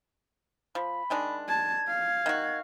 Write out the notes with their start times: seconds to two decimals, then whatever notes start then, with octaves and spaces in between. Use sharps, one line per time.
0.75 F3 B5
1.10 D#3 G#3 D4
1.48 A5 G#6
1.88 F5
2.26 D#3 F#4